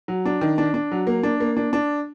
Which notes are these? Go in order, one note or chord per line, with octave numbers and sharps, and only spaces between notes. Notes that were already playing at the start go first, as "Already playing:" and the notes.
F#3
D4
D#3
D4
D4
F#3
A#3
D4
A#3
D4
D4